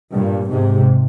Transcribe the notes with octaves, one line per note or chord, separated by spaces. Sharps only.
G2 A#2
G#2 C3